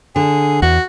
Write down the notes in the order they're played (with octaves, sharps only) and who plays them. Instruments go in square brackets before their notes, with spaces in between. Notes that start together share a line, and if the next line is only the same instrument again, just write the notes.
[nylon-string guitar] D3 [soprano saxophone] G#4
[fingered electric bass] E2 [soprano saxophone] F#4